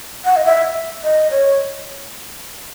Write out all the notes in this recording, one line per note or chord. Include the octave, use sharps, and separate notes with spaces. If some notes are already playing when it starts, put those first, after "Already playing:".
F#5
D#5
E5
D#5
C#5